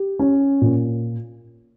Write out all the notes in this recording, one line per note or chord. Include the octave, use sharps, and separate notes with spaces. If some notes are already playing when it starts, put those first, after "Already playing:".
Already playing: G4
C#4
A#2